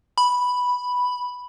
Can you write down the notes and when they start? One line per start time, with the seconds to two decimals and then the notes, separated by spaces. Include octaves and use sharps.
0.18 B5